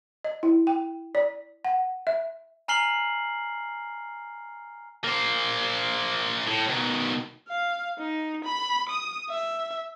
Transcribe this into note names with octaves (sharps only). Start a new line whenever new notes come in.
D#5
E4
G5
D5
F#5
E5
G#5 A#5 F6 C7 F#7 G7
A#3 C5
A2
B2 D#3
F5
D#4
B5
D#6
E5